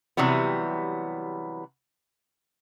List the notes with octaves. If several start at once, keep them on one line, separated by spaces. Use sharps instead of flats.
C3 E3 F#3 G3 B3